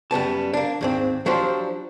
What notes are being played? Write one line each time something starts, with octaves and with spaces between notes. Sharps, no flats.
F#2 G3 B3 A5
A#3 D4
D#2 G#2 C4
F3 F#3 D4 G4 C5